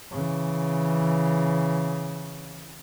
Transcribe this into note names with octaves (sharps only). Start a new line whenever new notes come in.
C#3 E3